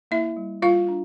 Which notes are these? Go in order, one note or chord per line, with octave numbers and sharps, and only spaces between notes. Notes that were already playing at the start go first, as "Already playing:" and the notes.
A#3 E4 E5
G3
G3 F4 F5
D4